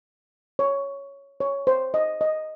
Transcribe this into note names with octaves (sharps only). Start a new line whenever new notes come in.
C#5
C#5
C5
D#5
D#5